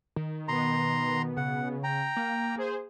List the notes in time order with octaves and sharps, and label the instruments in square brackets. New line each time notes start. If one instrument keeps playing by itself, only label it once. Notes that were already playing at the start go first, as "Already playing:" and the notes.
[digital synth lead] D#3
[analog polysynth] B2 B3 [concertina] A#5 C6
[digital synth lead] C#3 [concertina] F#5
[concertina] G5 A#5
[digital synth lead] A#3
[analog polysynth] G#4 C5